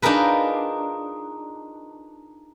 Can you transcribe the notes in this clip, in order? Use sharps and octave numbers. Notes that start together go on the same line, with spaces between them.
D4 D#4 F4 G#4 A#4 B4